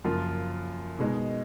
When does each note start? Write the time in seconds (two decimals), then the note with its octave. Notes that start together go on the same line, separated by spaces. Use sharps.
0.04 F#2 C#3 F3 A#3 F4
0.99 B2 G#3 D#4